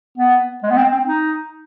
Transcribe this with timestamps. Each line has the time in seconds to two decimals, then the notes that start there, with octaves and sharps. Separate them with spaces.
0.18 B3
0.63 G#3
0.70 B3
0.76 C4
0.92 C4
1.06 D#4